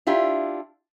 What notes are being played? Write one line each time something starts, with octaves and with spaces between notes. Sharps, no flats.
D4 E4 F4 G4